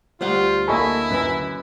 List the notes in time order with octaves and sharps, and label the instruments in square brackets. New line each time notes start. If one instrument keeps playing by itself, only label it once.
[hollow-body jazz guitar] D2 C5 F#5 [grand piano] G3 [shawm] F4
[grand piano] A#3 D#5 B5 [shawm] E4 [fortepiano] A4 G#5 C#6
[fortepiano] F#2 B4 G#5